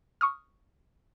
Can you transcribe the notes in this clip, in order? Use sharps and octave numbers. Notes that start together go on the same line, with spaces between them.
C#6 D#6 F6